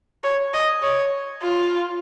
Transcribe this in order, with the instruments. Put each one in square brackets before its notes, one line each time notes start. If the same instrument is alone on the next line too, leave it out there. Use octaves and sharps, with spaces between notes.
[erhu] C#5
D#5
C#5
F4